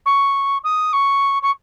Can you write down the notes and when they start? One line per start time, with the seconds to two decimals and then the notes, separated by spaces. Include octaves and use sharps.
0.06 C#6
0.64 D#6
0.93 C#6
1.42 C#6